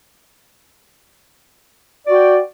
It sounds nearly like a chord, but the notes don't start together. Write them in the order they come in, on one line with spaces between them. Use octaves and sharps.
D5 F#4 G5